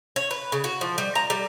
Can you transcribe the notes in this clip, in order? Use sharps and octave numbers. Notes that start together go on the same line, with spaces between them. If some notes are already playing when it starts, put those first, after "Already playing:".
C#5
B4
C#3
F#4
F3
G3
A#5
G3